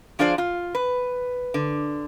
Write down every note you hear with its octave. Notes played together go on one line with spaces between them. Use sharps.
F3 D4 F4 G#4 C5 D5
F4
B4
D3